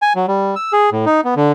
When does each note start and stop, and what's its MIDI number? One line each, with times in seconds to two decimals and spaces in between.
0.02 0.13 80
0.15 0.26 54
0.28 0.55 55
0.56 0.73 88
0.73 0.90 68
0.92 1.05 45
1.06 1.21 63
1.25 1.34 59
1.36 1.52 50